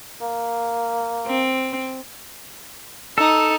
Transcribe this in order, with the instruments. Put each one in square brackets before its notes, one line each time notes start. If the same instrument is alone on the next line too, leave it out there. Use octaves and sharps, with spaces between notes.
[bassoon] A#3
[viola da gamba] C4
[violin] D#4 [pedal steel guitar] A4